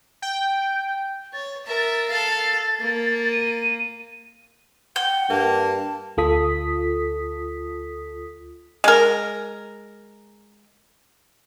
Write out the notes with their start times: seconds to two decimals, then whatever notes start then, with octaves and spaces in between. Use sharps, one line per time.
0.22 G5
1.34 C#5 A6
1.67 A#4 E5
2.09 A4 F5
2.80 A#3
3.32 D#7
4.96 F#5 G5
5.30 G2 A#3 A5
6.17 D2 F4 A4 D#6 B6
8.84 G#3 A#4